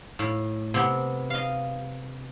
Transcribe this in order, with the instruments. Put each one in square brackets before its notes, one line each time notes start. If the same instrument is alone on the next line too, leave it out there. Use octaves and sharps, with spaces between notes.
[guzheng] A2
C3 B3
D#5 F5